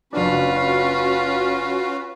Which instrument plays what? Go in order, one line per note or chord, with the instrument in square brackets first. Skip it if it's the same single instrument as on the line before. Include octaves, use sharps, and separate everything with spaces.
[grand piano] F#1 D4 [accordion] C#4 F#4 [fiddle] F4 B4